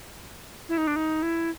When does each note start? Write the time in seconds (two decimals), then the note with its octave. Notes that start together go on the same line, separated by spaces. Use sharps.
0.69 E4
0.78 D#4
0.87 D4
0.96 D#4
1.23 E4